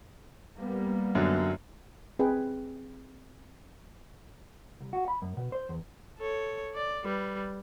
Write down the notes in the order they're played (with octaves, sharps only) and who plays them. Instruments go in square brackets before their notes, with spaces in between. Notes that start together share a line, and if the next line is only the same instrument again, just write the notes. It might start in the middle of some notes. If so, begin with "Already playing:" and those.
[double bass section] G3 A#3 B3
[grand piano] F#2 D3 F#3
[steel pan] C4 G#4 B4 G5
[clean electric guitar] C2
F#4
B5
F#2
B2
C5
E2
[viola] A4 C#5
D5
G3 B4